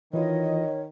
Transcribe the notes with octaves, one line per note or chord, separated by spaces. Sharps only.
D#3 E3 E4 F4 C#5 D#5